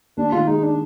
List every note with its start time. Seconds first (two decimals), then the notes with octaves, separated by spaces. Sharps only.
0.17 D#2 D4
0.32 D#3 F4
0.47 G#3 D#4
0.63 D4